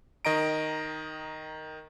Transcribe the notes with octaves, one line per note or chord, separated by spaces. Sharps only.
D#3 D#5 A#5 D7